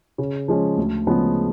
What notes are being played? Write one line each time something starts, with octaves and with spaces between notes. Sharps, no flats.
C#3
F3 G#3 C#4
D2
C#3 F3 G#3 B3